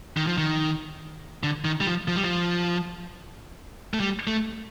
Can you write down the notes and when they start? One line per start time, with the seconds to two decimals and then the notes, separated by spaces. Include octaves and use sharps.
0.17 D#3
0.27 F3
0.38 D#3
1.43 D3
1.65 D#3
1.81 G3
1.87 F3
2.08 F3
2.16 G3
2.24 F3
3.94 A3
4.00 G3
4.27 A3